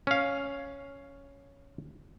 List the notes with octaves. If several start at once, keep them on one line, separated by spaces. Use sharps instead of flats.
C#4 F5